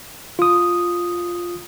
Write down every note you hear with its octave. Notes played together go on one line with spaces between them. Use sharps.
F4 D#6